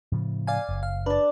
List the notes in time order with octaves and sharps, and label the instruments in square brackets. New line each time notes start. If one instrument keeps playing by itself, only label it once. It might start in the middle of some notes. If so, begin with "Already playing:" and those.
[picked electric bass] A2 C#3 F3
[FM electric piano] D5 F5 G#5
[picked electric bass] F#1
[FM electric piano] F5
[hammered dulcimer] D4 D5 [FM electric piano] B4